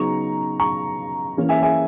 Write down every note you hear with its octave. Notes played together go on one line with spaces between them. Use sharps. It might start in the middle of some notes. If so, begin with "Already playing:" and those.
Already playing: C#3 F#3 B3 D#4 A#5 C#6
A#5 C#6
E3 A#3 C#4
E5 G#5
E5 G#5